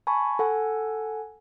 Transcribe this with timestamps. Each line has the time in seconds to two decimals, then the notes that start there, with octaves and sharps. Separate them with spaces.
0.07 G#5 A5 B5 C#6
0.39 A4 F#5 G#5